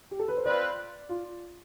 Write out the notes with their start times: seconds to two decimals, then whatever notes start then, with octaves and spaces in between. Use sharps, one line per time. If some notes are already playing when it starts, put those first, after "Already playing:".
0.11 G4
0.19 A4
0.28 B4
0.37 C5
0.45 C4 F4 B4 D5
1.09 F4